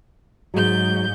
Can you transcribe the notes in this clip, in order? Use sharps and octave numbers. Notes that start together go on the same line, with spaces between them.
G#2 F#3 G#3 G6